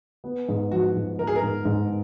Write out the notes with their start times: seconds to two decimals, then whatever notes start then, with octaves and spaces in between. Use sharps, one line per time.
0.24 B3
0.48 G#2
0.72 F3 F#4
0.95 G#2
1.18 B3 A#4
1.27 G#4
1.36 A#4
1.42 G#2
1.65 G#2